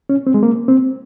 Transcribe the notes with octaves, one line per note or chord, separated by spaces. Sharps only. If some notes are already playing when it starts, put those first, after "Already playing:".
C#4
C4
G#3
A#3
C4